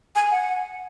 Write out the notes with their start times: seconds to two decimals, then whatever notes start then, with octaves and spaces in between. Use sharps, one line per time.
0.16 G#5
0.31 F#5